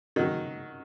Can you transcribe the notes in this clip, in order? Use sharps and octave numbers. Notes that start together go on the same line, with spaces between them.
D#3 F#3